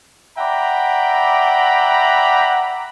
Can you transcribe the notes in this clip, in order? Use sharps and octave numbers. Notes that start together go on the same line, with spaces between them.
D5 E5 F#5 G5 A#5 B5